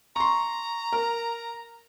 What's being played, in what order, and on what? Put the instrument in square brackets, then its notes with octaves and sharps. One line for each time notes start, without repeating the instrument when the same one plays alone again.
[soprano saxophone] A#5 [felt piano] C6 C#6
[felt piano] A#4